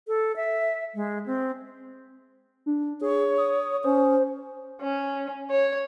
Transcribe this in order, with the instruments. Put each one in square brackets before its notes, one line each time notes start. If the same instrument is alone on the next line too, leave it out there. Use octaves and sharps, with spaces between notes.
[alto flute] A4
E5
G#3
C4
[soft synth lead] D4
[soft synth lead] G#4 [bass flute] C#5
[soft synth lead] D#6
[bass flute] C#4 [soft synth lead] C5
[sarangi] C#4
C#5